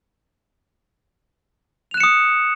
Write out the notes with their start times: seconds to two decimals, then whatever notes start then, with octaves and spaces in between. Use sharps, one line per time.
1.91 F7
1.94 F#6
1.97 E7
2.00 C#7
2.04 D#6